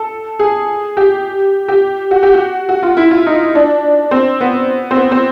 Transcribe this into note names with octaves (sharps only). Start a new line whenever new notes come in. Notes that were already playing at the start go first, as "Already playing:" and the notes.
Already playing: A4
G#4
G4
G4
F#4
G4
F#4
F#4
F4
E4
F4
D#4
D4
C4
B3
C4
B3
C4